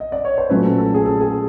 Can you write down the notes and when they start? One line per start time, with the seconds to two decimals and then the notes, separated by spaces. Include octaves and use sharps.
0.00 D#5
0.12 D5
0.25 C#5
0.38 C5
0.49 A#2 F#3 A3 C#4 B4
0.64 A4
0.78 A4
0.94 G#4
1.06 A4
1.20 G#4